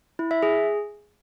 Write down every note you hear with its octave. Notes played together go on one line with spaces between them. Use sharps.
E4
E5
G#4